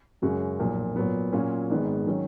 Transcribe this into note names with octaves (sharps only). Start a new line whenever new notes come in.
F#2 C#3 G#3 C#4 F#4
B1 A#2 F3
A#2 F#3 B3
A#2 F#3 C#4 F4
G#1 G#2 D#3 G#3 B3
D#3 F#3 C#4